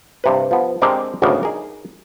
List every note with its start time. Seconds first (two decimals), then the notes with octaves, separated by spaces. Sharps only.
0.24 G2 C3 B4
0.51 F3 B3
0.82 G#3 C4 D4 G4 A#4 D5
1.22 G#1 D2 C#3 B3 D5 F5
1.43 D#4 G#4 A#4